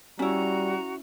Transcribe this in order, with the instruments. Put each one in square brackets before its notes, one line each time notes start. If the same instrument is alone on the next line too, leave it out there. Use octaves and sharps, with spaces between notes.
[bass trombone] G3 [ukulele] C#4 E4 [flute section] F#4 A#5